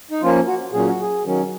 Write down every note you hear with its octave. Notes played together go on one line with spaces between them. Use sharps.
D#4
F3 A#3 C#4 F4
F#4
A#2 F#3 C#4 G#4
F#4
G#4
D#3 F#3 C#4